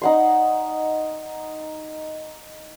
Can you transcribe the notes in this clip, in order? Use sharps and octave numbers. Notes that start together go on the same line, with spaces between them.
D#4 F#5 C6